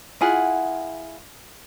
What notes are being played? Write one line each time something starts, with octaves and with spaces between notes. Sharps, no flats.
E4 F4 G#4 F#5